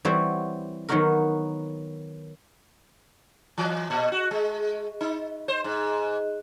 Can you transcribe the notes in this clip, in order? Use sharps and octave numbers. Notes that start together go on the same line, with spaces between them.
E3 G3 C4 F#4 C5 C#5
D#3 F#3 B3 D#4 F#4 A#4
E3
A#2
F#4
G#3
D#4
C5
G#2